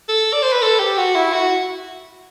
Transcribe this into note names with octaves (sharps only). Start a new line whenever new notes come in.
A4
D5
C5
B4
A4
G4
F#4
E4
F#4